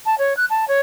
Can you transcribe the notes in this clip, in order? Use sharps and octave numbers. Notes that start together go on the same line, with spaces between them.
A5
C#5
F#6
A5
C#5